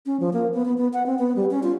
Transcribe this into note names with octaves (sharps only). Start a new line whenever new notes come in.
C#4
F3
A#3
B3
B3
B3
F#5
C4
B3
G3
C#4
F4